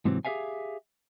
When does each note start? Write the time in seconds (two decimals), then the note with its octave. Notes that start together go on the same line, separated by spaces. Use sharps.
0.05 G#2 C3 E3 F#3 C4
0.25 G4 G#4 A#4 E5 F5 G#5